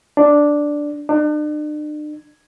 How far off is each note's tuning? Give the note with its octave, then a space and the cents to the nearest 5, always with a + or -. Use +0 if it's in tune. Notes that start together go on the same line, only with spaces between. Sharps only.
D4 +0
D4 +45